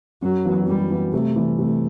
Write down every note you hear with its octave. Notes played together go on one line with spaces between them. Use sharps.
F#2 F#3
E3 B3 F#4
F#2 G3
E3 B3 F#4
C3 A3
E3 G3
C3 A3